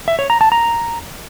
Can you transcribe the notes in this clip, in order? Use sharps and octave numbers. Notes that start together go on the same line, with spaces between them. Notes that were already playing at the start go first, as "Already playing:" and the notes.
E5
C#5
A#5
A5
A#5